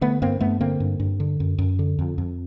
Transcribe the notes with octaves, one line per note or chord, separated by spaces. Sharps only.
D3 A3 B3
G2 A#3 C4
G2 A3 B3
D3 A#3 C4
G2
G2
D3
F#2
F#2
D3
F2
F2